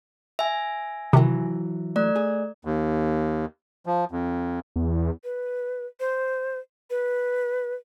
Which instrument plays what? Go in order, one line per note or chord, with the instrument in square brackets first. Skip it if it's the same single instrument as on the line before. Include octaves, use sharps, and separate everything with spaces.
[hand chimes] E5 G#5
[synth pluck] C3 D#3 [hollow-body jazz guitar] E3 F#3
[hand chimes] A3 D5
[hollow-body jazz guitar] G#4
[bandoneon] D#2
F3
F2
[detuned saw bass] E2
[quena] B4
C5
B4